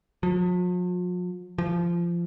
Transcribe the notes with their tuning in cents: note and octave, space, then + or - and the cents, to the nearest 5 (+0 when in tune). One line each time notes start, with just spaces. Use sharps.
F3 +45
F3 -20